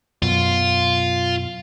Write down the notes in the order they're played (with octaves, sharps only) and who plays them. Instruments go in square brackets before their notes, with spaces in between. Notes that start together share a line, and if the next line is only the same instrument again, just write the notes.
[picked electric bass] F#2 B2 [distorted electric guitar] F4